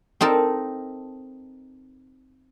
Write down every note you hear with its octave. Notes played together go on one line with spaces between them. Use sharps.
C4 D#4 A4 A#4